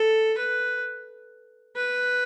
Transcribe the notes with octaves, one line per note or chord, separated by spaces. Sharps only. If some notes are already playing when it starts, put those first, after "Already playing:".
Already playing: A4
B4
B4